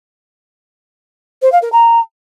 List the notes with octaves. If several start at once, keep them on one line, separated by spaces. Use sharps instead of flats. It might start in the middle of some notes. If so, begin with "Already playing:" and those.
C5
F5
A#4
A#5